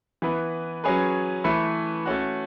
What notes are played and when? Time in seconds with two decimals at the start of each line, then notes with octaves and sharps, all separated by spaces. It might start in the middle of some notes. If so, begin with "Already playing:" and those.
0.22 E3 B3 E4 B4
0.84 F#3 C#4 G#4 B4
1.44 E3 A3 E4 B4
2.06 A3 C#4 F#4